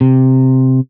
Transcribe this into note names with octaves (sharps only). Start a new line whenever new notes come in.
C3